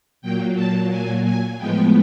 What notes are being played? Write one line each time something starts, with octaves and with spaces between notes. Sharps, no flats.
A#2 F#3 A#3 G5
A5
G#5
G#5
A2 F3 G#3 B3 G5